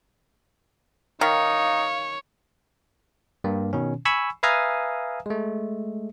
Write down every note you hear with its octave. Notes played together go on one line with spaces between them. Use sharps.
D#3 D#4 C#5 F5
G2 A#3
B2 D#3 C#4
G#5 B5 C#6 E6
B4 E5 F5 G#5 A#5 D#6
G#3 A3